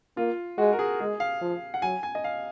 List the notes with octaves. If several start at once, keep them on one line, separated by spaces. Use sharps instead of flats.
A#3 F4
G#3 F#4
A#4
G#4
G#3 G#4
F5
F3
F#5
F#3 G#5
G#5
D#5
F5